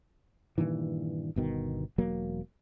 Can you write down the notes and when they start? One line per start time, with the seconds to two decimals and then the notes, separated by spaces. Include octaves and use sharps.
0.58 G2 A#2 D#3 E3
1.36 G1 B2 D#3
1.98 E1 F#3 A#3